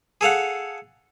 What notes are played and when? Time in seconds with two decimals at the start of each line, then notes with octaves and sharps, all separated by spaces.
0.21 G#4 A4 F5 F#5